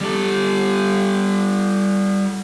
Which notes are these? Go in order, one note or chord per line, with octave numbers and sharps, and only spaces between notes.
G3 A4